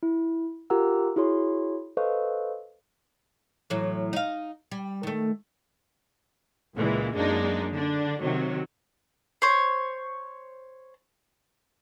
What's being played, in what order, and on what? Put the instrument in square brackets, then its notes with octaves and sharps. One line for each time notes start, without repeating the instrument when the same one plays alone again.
[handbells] E4
F4 G4 A#4 F#5 A#5 E6
E4 F#4 G#4 C#5 C6
A4 B4 C5 D#5 F5 C#6
[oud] A2 E3 F#3
D#4 F5
G3
D#3 A3
[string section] C#2 A#2 E3 G#3
F#2 G#3 A#3 D4 D#4
D3 D4
C3 D#3 F#3
[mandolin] C5 C#5